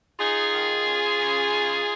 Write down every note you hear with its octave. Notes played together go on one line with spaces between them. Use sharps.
D#4 F4 G#4
D#3
C#4
C#3
D#4